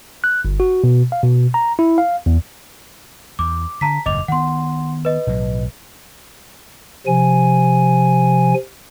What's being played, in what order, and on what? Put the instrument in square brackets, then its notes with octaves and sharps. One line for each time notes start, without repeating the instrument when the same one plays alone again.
[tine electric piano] F#6
G1
F#4
B2
F5
B2
A#5
E4
F5
E2
[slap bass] E2 [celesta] D6
[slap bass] D3 [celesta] A5 A#5 B6
[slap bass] F#1 E2 A2 [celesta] D#5 D6 F7
[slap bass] D#3 B3 [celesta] F#5 C6
[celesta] B4 D#5
[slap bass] B1 A2 F#3
[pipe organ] C3 F3 G#5